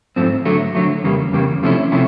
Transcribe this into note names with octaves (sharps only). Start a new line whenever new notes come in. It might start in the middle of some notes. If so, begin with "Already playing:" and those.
G#2 F3 A3 C4
D3 F#3 A3
D3 F#3 A3
E2 C#3 G3 A#3
E2 C#3 G3 A#3
C3 F3 A3 C#4 E4
C3 F3 A3 C#4 E4